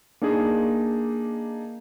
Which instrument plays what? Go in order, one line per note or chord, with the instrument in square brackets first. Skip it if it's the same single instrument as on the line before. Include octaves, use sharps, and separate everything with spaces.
[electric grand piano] A#3 D4 D#4 G#4